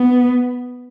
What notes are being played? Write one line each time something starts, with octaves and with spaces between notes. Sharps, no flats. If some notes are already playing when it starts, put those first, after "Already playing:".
Already playing: B3